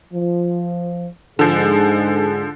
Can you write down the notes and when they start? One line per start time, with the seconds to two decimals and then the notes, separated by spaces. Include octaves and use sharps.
0.13 F3
1.39 G#2 D3 F3 G#4